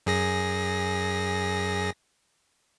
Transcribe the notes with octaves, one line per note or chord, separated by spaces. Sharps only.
F#2 G#4 A#6